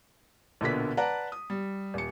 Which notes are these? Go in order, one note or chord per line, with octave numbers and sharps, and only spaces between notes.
A#1 B2 D3 A#3 B3 B6
B4 D5 F#5 A5 A#5
D#6
G3
D#1 C#7